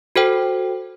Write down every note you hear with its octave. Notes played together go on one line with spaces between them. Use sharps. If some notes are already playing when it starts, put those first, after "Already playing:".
F#4 A4 C5 G5